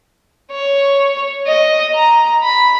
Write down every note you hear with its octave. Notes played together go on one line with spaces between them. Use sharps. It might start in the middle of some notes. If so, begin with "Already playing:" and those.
C#5
D#5
A#5
B5